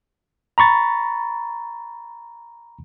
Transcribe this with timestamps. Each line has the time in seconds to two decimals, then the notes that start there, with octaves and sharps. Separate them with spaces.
0.58 A#5 B5 C#6 A6